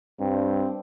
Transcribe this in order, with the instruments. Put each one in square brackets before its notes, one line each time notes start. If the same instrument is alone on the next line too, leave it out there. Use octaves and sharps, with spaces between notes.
[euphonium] G2 [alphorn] C4